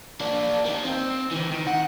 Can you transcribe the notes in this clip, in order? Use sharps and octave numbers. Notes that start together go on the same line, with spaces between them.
A#3 D4
A#3 D#4
C4
D#3 E3
D#3
F#5